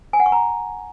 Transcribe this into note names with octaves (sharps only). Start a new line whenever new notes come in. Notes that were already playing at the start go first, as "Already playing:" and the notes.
G#5
F#5
C#6
A#5